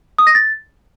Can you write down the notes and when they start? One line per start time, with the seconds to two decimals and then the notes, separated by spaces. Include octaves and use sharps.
0.19 D#6
0.27 A#6
0.35 A6